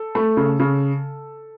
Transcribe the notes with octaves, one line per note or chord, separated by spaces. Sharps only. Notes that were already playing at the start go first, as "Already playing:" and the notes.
Already playing: A4
A3
C#3
C#3